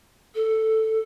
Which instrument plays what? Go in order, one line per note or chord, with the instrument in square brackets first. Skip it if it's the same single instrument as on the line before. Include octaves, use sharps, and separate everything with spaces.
[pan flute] A4